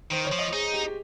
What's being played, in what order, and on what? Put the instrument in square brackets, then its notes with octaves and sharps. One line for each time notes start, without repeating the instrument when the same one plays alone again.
[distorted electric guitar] D#3 [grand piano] C5
[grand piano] C#5
[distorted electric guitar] F3
[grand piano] D#5
[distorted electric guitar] D#4 [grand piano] G#4
[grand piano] G4
G4